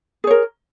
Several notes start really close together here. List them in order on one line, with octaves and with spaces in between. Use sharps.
G#4 C#5 A#4